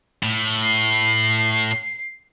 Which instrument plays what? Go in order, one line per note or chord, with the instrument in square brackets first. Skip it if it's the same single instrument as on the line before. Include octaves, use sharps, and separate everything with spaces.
[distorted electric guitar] A2
[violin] C7